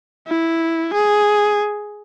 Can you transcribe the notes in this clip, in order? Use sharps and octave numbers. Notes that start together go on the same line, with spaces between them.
E4
G#4